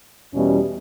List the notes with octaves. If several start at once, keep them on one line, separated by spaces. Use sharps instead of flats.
E2 B2 G3 C#4 E4